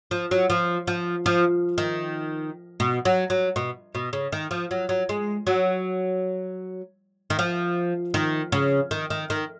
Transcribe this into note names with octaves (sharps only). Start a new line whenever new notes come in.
F3
F#3
F3
F3
F3
D#3
B2
F#3
F#3
B2
B2
C#3
D#3
F3
F#3
F#3
G#3
F#3
D#3
F3
D#3
C#3
D#3
D#3
D#3